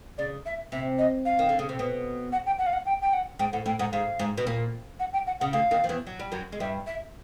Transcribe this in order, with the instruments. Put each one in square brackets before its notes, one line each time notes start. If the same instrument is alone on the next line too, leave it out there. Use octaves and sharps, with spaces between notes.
[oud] C#3 [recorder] D5
[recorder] E5
[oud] C3 [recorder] E5
[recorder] D#5
F5
[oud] D#3
D3
C#3
C3
B2
[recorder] F#5
G5
F#5
F5
F#5
G5
G5
F#5
[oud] G#2 [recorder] G5
[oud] A2 [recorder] F#5
[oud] A2 [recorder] G5
[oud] G#2 [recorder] F#5
[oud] G#2 [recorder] F5
[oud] G#2
B2
A#2
[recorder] F#5
G5
F#5
[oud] C#3 [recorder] F#5
[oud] D2 D3 [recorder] F5
[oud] D#2 D#3
F3
E2 E3
F#3
G3
F#2 F#3
G#3
[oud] G2 G3 [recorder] E5
[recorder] E5